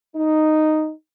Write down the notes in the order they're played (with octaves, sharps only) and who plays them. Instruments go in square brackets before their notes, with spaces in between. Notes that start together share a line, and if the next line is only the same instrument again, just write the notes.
[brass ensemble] D#4